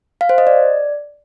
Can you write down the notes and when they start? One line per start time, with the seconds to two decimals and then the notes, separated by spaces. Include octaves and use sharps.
0.21 F5
0.29 C5
0.38 D#5
0.47 D5